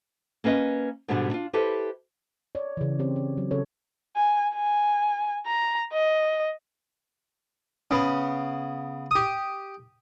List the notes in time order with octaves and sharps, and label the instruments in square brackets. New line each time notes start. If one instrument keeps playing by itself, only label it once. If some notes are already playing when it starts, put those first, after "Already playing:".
[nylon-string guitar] A#3 C#4 B4 D#5
G#2 B2 D3 G3 D4
D4 F4
E4 G4 A4 B4 C5
[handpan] C#5 D5
C#3 E3
C4 G4 C5 C#5
C#5
F#3
C#3 C#4 A4 C#5
[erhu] G#5
G#5
A#5
D#5
[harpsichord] C#3 B3
G4 D#6